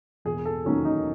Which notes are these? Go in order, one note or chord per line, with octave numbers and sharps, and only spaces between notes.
E1 G#4
A4
D#2 D#3 F#3 C#4
D#4